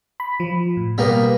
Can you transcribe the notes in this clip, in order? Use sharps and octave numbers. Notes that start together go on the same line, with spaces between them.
B5
F3
A2
B2 G3 A#3 B3